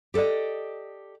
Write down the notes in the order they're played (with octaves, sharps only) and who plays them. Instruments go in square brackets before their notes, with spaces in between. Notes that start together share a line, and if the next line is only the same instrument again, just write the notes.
[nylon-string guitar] G4 A4 B4 D5 D#5